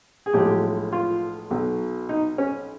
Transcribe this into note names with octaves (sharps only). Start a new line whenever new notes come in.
G#4
B1 A2 F3 G#3 G4
F4
B1 B2 F#3
D#4
C#4